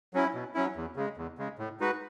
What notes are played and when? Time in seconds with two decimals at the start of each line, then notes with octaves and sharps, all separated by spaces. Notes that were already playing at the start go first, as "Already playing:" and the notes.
0.14 F#3 C#4 E4
0.34 B2
0.55 F#3 C#4 E4
0.76 E2
0.96 C#3 G#3
1.17 E2
1.38 C#3 G#3
1.59 A2
1.80 G#3 D#4 F#4 B4